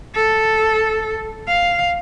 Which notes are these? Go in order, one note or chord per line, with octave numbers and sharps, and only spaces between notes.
A4
F5